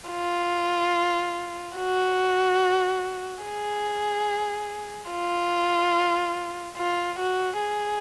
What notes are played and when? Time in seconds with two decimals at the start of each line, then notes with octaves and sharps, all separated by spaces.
0.10 F4
1.77 F#4
3.44 G#4
5.11 F4
6.77 F4
7.19 F#4
7.60 G#4